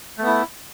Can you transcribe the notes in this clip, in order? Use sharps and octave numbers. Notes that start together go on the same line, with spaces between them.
A3 B3 E4